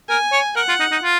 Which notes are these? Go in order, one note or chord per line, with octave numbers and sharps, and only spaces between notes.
A#4 G#5
C#5
A#4 F#5
F4
D#4
D#4
F4